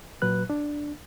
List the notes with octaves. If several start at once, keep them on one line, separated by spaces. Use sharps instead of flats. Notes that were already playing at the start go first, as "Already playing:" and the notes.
A#2 F#3 B4 F#6
D4